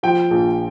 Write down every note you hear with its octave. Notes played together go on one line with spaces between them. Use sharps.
F3 G5
A#1